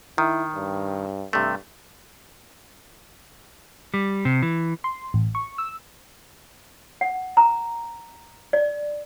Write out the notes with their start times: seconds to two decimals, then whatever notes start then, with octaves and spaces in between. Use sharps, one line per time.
0.18 D#3 E4
0.55 G2
1.33 G2 C3 A3
3.94 G3
4.25 C3
4.42 E3
4.84 C6
5.14 A1
5.35 C#6
5.58 E6
7.01 F#5
7.37 A#5
8.53 D5